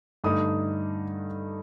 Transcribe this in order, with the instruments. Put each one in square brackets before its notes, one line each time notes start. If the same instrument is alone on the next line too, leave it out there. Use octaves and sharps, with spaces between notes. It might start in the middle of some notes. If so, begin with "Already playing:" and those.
[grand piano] G2 D3 A3 D#4 D#6